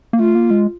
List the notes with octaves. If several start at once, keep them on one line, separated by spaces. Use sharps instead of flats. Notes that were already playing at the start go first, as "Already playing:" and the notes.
A#3
A3 F4
A#3
G#3